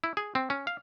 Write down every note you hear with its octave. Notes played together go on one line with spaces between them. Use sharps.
E4
G#4
C4
C#4
F5